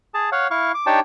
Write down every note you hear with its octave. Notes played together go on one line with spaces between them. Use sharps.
G#4 A5
C#5 F5 F#5
E4 F5 C#6
D6
D4 D#4 G4 C#5 G5 A5